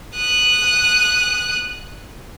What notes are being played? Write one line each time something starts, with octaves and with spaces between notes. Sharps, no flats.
D#6 F#6